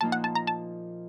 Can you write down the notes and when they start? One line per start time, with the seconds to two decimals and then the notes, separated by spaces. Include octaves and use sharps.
0.01 A#2 F3 A#3 D#4 A5
0.12 F#5
0.24 A5
0.35 A#5
0.47 A5